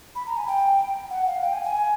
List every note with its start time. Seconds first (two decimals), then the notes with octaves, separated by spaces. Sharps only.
0.15 B5
0.26 A#5
0.37 G#5
0.47 G5
1.10 F#5
1.27 F5
1.42 G5
1.53 G#5
1.64 G#5